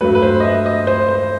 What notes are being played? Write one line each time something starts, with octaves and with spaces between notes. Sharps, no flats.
G2 F#3 A3 B4
B4
C5
D#5
E5
D#5
C5
C5